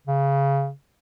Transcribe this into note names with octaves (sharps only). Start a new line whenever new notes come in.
C#3